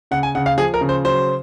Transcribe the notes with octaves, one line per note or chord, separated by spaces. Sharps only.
C#3 F#5
G#5
C#3 F#5
F5
F3 G#4
A#4
C#3
C5
F#3 C5